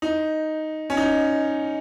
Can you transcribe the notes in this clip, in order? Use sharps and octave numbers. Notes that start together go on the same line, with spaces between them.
D#4
C#4
D#4